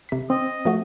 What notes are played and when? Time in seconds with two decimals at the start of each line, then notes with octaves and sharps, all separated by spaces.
0.09 C3 B6
0.30 C4 D#5
0.65 F3 A3 F#4